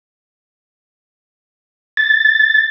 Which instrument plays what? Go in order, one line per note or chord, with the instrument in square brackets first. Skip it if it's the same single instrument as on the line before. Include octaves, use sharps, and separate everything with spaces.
[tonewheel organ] A6